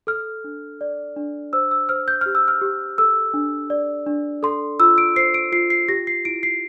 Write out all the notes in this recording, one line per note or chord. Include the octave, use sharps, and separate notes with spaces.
A4 F6
D4
D5
D4
C5 E6
E6
C5 F6
G6
G4 F6
E6
F6
G4
A4 E6
D4
D5
D4
A4 C6
F4 E6
D7
C5 C7
D7
F4 C7
C7
G4 A#6
C7
E4 D7
C7